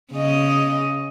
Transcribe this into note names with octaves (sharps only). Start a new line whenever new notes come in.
C#3 C#4 D#5